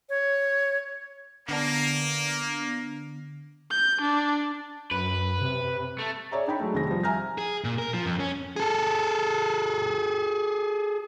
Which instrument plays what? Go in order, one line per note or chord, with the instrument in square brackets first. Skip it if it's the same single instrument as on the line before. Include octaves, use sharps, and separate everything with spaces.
[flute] C#5
[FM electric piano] D3 B3 D4 [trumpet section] A#3
[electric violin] G6
D4
[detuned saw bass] F#2 [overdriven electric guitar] B4
[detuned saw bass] C3
[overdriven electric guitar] A3
[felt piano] G#4 C#5 D5 E5 A#5
D4 D#4 G5 A#5 B5
F#3 G#3 A3
F1 D#3 G#4 A#6
F3 G3
E5 G#5 A#5 F6 A#6
[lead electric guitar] G#4
A#2
A#4
F3
F2
C#4
G#4 A4